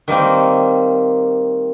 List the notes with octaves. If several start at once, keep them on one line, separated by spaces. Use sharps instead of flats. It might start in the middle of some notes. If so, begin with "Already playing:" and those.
D#3 G3 A#3 C4